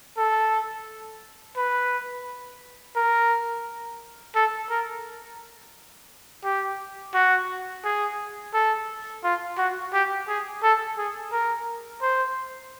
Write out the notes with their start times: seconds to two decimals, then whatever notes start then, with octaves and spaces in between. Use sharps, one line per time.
0.17 A4
1.56 B4
2.96 A#4
4.35 A4
4.70 A#4
6.44 G4
7.14 F#4
7.84 G#4
8.54 A4
9.24 F4
9.58 F#4
9.93 G4
10.28 G#4
10.63 A4
10.97 G#4
11.32 A#4
12.02 C5